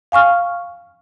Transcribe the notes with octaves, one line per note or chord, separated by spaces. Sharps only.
F5 G#5 C#6 F6